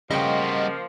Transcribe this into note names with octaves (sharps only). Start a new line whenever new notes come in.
C#3 F3 G3 A#3 F#4 D#5 G5